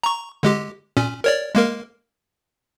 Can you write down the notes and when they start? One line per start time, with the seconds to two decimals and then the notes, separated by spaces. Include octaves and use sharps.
0.03 A#5 C#6
0.43 D3 G#3 G4
0.97 A#2 C#4
1.24 A#4 C#5 D5
1.55 G#3 A#3 A#4